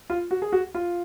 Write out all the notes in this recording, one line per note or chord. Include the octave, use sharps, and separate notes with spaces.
F4
F#4
G#4
F#4
F4